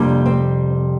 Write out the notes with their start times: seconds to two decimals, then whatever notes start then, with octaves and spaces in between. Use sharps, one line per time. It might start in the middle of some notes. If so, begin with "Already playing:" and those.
Already playing: F2 C3 G3 A#3 D4
0.26 C4